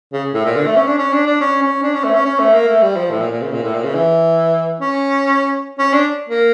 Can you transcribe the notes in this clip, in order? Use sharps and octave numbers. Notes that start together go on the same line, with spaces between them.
C#3
A2
A#2
D3
A3
C#4
D4
C#4
D4
D4
C#4
C#4
D4
C#4
A3
C#4
C#4
A3
A#3
A3
G3
F3
A2
A#2
A#2
C#3
A#2
A2
A#2
C#3
E3
C#4
C#4
D4
A#3